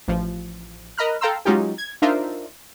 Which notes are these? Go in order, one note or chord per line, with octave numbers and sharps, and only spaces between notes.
A1 F3
A#4 D#5 A#5 B5 F6 F#6
A4 F5 G5 A#5 C6 E6
F#3 G#3 C#4 D#4 F4 G4
G#6
D4 D#4 F4 A#4 C5 E5